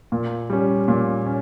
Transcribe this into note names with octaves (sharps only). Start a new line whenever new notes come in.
A#2
G3 C#4
A#2
C#4